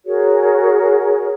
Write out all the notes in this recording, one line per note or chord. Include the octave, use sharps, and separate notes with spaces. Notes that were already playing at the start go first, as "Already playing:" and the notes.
F#4 G#4 A#4 C#5